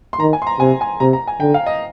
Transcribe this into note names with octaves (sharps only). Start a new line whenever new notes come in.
C6
D#3 A#5
G#5
C6
A#5
C3 G#5
G#5
C3 A#5
A#5
G#5
D3 G5
F5
D#5